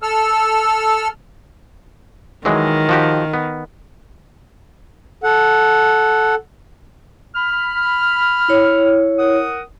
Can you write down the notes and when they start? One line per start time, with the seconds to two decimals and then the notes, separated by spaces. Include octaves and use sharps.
0.02 A4 E6 F6
2.45 D#3 E3 F#3 G#3
2.89 F3 F#4 G4
3.34 B3
5.24 A4 F#5
7.35 B5 F6
8.48 E4 C#5
9.19 A#4 F#5 D#6